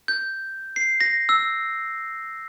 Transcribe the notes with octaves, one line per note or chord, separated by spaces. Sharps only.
G6
C7
A#6
E6